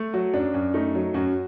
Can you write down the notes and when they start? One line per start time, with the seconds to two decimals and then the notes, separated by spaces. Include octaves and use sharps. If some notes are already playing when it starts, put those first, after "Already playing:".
Already playing: A3
0.14 F#3 F#4
0.33 F#2 D4
0.54 F#2
0.74 A3 D#4
0.94 F#3
1.14 F#2 F#4